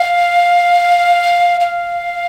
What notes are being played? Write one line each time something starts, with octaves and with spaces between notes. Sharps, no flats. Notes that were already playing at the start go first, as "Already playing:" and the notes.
Already playing: F5
F5